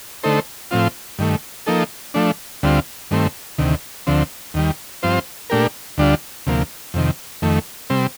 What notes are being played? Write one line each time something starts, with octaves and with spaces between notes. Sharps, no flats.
D3 A3 D#4 A4 C5
A2 F3 C4 F4
G2 D#3 A3
F3 A#3 D#4 A4
F3 A3 D4
D2 D3 G3 C4 F4
G2 D#3 A3 C4
D2 C3 D#3
D2 D3 F3 C4
D#2 D#3 G3
G2 F3 C4 F4 C5
A#2 A3 D4 G4 A#4
D2 D3 G3 D4 F4
D2 C3 F3 A#3
F2 C3 D#3
F2 D#3 A3
C3 G3 C4